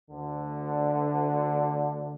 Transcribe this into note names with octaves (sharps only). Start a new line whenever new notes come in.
D2 D3